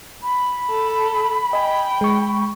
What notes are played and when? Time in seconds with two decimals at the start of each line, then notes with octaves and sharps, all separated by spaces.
0.23 B5
0.70 A4
1.53 D#5 G5 G#5
2.01 G#3 C#6